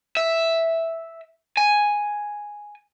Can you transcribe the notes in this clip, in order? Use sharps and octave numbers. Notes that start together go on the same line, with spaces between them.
E5
G#5